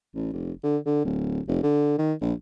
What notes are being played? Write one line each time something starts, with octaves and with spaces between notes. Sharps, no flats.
A1
F1
D3
D3
D1
F1
D3
D#3
A#1